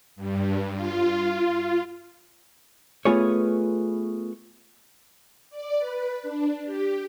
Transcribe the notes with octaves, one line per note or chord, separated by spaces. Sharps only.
G2
F4
A3 B3 F4 G#4 B4 C#5
D5
B4
D4
G4